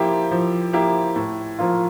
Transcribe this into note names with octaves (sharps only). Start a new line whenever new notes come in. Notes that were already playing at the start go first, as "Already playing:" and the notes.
Already playing: F3 A#3 E4 G4
F3
A#3 E4 G4
A2
F3 A#3 F4